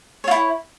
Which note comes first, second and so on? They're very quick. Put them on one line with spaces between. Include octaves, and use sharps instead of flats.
C#5 F4 E4